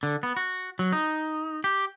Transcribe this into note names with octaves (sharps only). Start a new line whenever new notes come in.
D3
B3
F#4
F#3
D#4
G4